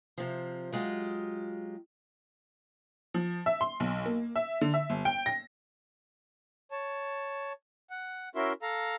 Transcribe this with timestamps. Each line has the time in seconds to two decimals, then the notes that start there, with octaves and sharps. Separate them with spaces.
0.18 C3 F3
0.73 F#3 G#3 F4 G4
3.14 F3
3.46 E5
3.61 C6
3.80 B1
4.06 A#3
4.36 E5
4.61 D3
4.74 E5
4.90 G1
5.05 G5
5.26 A#6
6.71 C#5 A5
7.90 F#5
8.35 C#4 E4 F#4 A#4 E5 C6
8.62 A4 F5 A#5